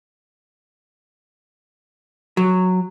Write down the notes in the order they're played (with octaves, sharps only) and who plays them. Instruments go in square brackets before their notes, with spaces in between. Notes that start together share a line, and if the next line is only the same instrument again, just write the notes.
[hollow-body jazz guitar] F#3